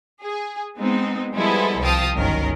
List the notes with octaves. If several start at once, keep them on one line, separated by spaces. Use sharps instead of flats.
G#4
G#3 B3 C4 D#4
F3 G3 G#3 B3 E4 A4
C2 F3 F5 G5 A5 D#6
G1 C#2 F#2 D#3 C#4 A#4